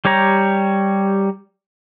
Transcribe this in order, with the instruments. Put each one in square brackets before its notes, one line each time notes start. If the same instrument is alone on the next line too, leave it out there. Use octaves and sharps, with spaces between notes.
[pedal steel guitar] G3 G4 C#5 A#5